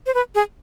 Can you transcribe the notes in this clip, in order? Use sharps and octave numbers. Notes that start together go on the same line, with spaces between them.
C5
B4
G#4